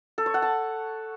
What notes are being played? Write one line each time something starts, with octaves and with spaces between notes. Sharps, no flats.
A4
C#5
F#5
A5